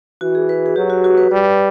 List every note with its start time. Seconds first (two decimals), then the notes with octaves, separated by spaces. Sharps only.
0.21 E3 F#4
0.35 G#4
0.49 B4
0.66 G#4
0.76 F#3 G4
0.90 F#4
1.04 F#4
1.18 B4
1.32 G3